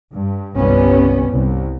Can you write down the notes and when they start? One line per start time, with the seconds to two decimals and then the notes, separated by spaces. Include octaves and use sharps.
0.13 G2
0.57 G1 C2 G3 B3 C#4
1.29 C2